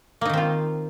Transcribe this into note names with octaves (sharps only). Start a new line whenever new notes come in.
D#3 A#3 C4 D#4 F4